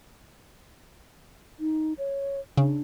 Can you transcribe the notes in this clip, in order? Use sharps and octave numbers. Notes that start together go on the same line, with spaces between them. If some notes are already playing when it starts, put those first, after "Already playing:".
D#4
C#5
C#3 D4